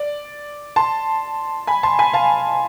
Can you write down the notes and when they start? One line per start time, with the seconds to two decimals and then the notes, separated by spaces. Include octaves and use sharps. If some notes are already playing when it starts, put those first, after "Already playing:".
Already playing: D5
0.76 A5 C6
1.67 G#5 B5
1.83 A5 C6
1.99 G#5 B5
2.13 F5 A5